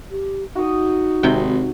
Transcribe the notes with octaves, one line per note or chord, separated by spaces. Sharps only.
G4
D#4 F#4 D#6
G#1 C3 G5